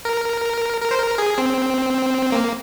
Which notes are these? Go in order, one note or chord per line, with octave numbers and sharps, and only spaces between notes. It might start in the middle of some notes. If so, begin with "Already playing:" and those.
A#4
A#4
C5
A#4
G#4
C4
A#3